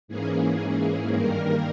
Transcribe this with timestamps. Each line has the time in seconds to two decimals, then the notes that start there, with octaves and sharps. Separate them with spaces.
0.08 G#2 E3 A#3 C#4 G#4
1.13 G2 D#3 G3 A#3 A#4